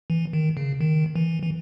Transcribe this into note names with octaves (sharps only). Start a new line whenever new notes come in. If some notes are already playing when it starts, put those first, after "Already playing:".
E3
D#3
C#3
D#3
E3
E3